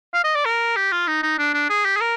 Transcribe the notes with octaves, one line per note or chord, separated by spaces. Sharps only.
F5
D#5
D5
A#4
G4
F4
D#4
D#4
D4
D4
G#4
G4
G#4
A#4